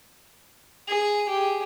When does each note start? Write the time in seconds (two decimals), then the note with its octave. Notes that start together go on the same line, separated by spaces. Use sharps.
0.88 G#4
1.29 G4 G#4